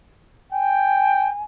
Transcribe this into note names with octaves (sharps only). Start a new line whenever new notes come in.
G5 G#5